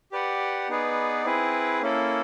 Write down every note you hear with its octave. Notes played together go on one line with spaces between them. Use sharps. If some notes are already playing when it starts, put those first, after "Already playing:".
G4 B4 D5 F#5
B3 D#4 G#4 B4 D5
C4 E4 G#4 B4
A#3 C#4 E4 A4